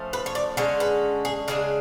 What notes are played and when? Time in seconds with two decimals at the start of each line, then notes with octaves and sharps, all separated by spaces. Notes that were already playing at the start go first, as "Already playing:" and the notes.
Already playing: F3 A3 C#4
0.13 B4
0.26 C#5
0.35 D5
0.57 D3 G#3 C#4 C#5
0.80 B4
1.25 G#4
1.48 C#3 G#3 D4 G#4